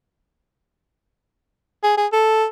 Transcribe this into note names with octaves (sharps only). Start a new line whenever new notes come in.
G#4
G#4
A4